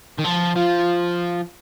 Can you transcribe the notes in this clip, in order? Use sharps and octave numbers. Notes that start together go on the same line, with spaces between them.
D#3
F3
F3 F4